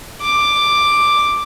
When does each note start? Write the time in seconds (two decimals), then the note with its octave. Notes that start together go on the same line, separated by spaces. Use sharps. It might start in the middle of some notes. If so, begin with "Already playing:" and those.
0.21 D6